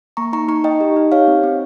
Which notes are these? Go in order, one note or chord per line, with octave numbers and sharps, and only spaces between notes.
A#3 A#5 C#6
D#4 A#5 C#6
D#4 A#5 C#6
D#4 D#5 G5
G4
D#4
G4 C#5 F5
C4
C4